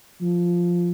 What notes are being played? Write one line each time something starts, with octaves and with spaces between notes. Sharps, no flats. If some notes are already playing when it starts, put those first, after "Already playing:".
F3